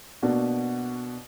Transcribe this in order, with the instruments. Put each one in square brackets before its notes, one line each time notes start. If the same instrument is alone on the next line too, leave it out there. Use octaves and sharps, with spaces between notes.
[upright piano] B2 A#3 D4 F#4